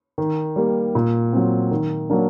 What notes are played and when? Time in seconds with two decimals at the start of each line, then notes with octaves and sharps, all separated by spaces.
0.18 D#3
0.56 G3 A#3
0.95 A#2
1.33 F#3 C4
1.71 D#3
2.10 F#3 A#3 D4